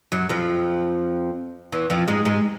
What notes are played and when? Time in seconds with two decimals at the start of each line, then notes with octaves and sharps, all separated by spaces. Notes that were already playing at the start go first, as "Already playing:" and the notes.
0.12 F#2 F#3
0.29 F2 F3
1.72 E2 E3
1.90 F2 F3
2.08 G#2 G#3
2.25 G#2 G#3